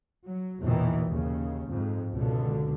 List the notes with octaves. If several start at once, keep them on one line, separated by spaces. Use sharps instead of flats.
F#3
A#1 E2 B2 D#3 E3
D#2 C#3
F2 G#2
C#2 B2 D3